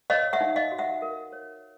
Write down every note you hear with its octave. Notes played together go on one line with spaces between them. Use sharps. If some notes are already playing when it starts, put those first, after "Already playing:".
C#5 D#5 F5
E5 F#5
D#4
D#5 F5
F#4
E5 F#5
A#4
C#5